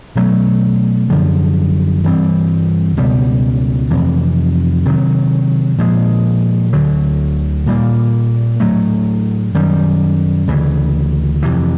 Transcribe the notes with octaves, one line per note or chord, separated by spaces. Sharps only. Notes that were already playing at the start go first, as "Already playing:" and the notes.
B2 F#3 A3
F#2 D3 F3
G2 E3 G3 C4
C#2 B2 G3
F2 C3 E3
C3 D#3 F#3
A#2 F3 G#3
D2 D3 F#3
A#2 G3 A#3
A2 F#3 A3
F#2 D#3 G3
D2 C#3 E3
F2 C3 E3